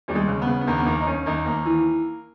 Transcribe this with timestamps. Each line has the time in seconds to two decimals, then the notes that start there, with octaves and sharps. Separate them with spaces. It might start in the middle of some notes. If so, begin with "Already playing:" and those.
0.08 D#2 G3
0.15 G#3
0.28 C#3
0.42 B3
0.48 C#3
0.61 B3
0.67 D#2 A#3
0.78 B3
0.86 D#2 A#3
1.01 D#4
1.07 D#2 C#4
1.26 D#2 D#4
1.45 D#2 A#3
1.65 E3